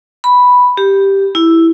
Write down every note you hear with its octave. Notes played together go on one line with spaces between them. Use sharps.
B5
G4
E4